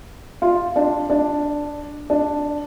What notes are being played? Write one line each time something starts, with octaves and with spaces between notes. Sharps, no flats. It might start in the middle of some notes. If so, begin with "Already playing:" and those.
F4
D4
D4
D4